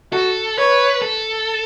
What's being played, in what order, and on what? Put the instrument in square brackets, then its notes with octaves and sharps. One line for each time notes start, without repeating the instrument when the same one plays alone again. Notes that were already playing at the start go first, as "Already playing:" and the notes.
[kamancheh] F#4 [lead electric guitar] A4
[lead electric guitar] B4 [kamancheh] C#5
[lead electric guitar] A4